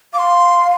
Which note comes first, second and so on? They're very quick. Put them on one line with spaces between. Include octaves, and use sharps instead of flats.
F5 D6 C6